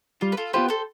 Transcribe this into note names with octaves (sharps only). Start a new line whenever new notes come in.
G3 F4
B4
F4 A4
B3 F4 G4 B4 C5
A4 C5